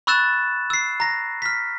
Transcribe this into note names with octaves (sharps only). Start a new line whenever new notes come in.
B5 C#6 E6 F#6 A6 E7
E6 C7
A#5 A#6
F6 B6